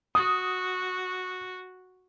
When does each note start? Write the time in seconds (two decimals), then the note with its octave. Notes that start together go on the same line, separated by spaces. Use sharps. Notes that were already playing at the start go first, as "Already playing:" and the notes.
0.15 F#4 D#6